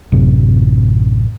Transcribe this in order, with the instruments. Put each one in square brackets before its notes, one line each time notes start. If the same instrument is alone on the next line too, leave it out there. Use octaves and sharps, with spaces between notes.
[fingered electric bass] A1 F#2 C3